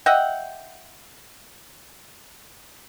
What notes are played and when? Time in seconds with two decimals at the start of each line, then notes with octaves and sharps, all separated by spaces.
0.06 D#5 E5 F#5 G5